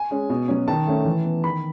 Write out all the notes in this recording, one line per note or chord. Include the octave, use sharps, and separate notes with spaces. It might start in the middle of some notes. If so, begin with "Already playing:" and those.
Already playing: G#5
G#3 C#4
B2
F#3 C#4
D#3 A5
A3 C#4
E3
B3
D#3 B5